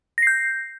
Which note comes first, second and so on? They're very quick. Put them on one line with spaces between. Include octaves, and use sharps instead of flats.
A#6 C7 G6